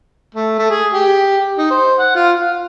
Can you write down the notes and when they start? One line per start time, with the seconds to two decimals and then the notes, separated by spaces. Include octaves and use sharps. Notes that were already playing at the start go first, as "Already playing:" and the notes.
0.35 A3
0.58 A3
0.70 G#4
0.93 G4
1.58 D#4
1.71 C5
1.99 F#5
2.15 F4
2.41 F5